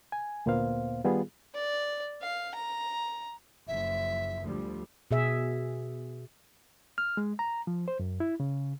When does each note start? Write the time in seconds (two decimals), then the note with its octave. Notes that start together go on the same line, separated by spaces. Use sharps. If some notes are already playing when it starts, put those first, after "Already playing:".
0.12 G#5
0.46 D2 A#2 A#3 B3 C5 F5
1.04 D#3 G3 B3 F4 G#4
1.55 D5
2.22 F5
2.55 A#5
3.68 F#1 F3 E5
4.41 D2 F3 G3
5.11 B2 G#4 E5
6.98 F6
7.17 G#3
7.39 A#5
7.67 F3
7.88 C5
8.00 F#2
8.20 E4
8.40 C#3